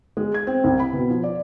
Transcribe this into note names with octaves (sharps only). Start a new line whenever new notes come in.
G#3
G#6
C4
C2
B5
B2
F3
D5